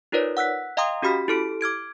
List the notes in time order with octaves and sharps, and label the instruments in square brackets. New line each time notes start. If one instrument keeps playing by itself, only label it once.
[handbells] D#4 F4 A#4 B4 C#5 D5
F#5 E6 F#6 B6
D#5 F5 G5 A#5 C6 D#6
C#4 F#4 G4 B5 F6 B6
E4 G4 A4 F6 D7
D6 F6 G#6 D7